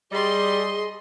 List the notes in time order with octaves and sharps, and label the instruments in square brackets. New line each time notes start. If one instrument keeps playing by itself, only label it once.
[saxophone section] G3 [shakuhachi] G#4 [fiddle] D#5 C6